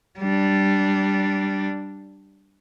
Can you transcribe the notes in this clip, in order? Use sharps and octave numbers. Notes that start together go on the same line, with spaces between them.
G3 D4